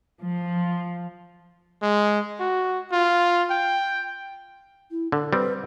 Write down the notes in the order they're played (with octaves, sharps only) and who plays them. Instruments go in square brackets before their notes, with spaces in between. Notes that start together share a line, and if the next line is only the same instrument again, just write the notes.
[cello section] F3
[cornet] G#3
F#4
F4
G5
[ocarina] E4
[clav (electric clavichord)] D3 [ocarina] A4
[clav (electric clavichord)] G3 C4 [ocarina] B4